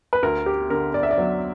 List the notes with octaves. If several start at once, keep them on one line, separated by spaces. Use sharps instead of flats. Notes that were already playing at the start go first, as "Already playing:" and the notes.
B4
D2 A#4
G4
D3 A#4
D5
E5
D5
F#3